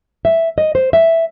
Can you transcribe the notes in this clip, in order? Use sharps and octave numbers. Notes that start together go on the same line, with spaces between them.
E5
D#5
C5
E5